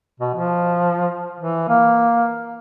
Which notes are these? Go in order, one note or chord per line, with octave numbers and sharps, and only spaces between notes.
B2
F3
E3
A#3